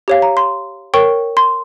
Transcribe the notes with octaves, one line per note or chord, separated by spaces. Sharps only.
G4 C#5 F5
A#5
C6
A#4 C#5 G5 C#6
C6